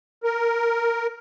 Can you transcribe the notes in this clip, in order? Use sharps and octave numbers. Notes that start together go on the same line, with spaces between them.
A#4